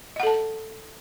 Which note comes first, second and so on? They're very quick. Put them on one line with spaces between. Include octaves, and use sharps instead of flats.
D#5 F#5 A4 A5